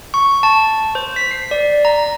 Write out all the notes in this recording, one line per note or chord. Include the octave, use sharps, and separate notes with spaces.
C#6
A5
C5
B6
C7
D5
A#5